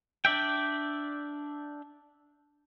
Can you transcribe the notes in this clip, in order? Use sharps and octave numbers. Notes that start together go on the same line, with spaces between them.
D4 D5 E5 G5